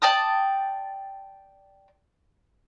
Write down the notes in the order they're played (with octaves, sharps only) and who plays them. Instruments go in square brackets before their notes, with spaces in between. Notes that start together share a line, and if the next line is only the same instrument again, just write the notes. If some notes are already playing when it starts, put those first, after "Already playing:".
[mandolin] D5 G5 A5 D#6